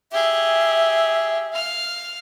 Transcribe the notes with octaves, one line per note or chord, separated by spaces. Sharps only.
G4 G#4 E5
F5 F6